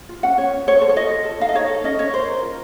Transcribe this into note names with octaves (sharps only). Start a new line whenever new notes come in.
F4
C#4 F#5
C#4 C#5
C#4
A4 C#5
A4 C5
C#5
F4 D#5
F4
A4
D#4 F5
D#5
D#4 C#5
A4
C#4 D#5
C#4 C#5
A#4 C5
A#4
F4